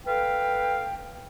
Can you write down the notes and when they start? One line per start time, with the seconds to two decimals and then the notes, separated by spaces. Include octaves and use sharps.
0.06 A4 B4 F5 G5